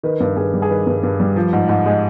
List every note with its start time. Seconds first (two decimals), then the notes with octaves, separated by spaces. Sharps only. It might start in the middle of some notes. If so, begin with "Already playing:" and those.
0.03 D#3 B4
0.20 G2
0.37 G2 G#4
0.54 G3
0.62 G#4
0.70 D#3 B4
0.87 G2
1.03 G2
1.20 G3
1.36 F3
1.53 G#2
1.69 G#2
1.86 G#3